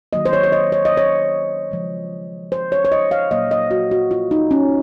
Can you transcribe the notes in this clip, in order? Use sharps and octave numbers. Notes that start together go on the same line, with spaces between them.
D#3 F#3 A#3 D#5
C5
C#5
C#5
D#5
C#5
D#5
C#5
C#3 F3 G#3
C5
C#5
C#5
D#5
F5
A#2 F#3 A#3 D#5
D#5
F#4
F#4
F4
D#4
C#4